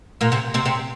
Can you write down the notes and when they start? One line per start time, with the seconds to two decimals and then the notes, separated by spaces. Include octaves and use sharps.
0.21 A#2 A#3
0.32 C3 C4
0.54 C3 C4
0.65 C3 C4